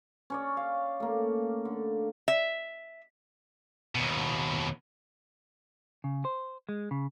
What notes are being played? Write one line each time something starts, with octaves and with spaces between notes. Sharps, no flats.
C#4 C#5 D5
F5
A3 A#3
D3
E5
D#2 B2
C#3
C5
G#3
C#3